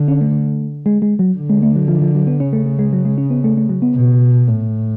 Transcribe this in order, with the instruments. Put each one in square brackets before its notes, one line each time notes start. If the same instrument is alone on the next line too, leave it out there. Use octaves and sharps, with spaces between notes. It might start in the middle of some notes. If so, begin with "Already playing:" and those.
Already playing: [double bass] D3
[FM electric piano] C#4
A3
G#3
G#3
F#3
[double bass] D3
[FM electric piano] G#3
A3
F#3
F3
F3
F#3
B3
[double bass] C#3 [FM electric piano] C#4
[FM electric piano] A3
A3
G#3
F#3
G#3
C#4
B3
A3
A3
F#3
B3
[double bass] B2
A2